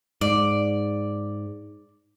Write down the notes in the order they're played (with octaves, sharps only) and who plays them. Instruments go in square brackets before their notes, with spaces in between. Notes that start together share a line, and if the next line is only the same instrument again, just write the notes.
[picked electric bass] G#2 [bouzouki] D5